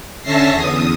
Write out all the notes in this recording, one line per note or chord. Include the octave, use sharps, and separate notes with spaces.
D3 C#4 E5 A5 A#6 C7
E2 D#6